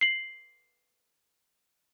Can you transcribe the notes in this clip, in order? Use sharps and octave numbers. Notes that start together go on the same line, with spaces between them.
C7 F#7